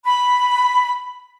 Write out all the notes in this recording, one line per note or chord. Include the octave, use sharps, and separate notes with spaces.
B5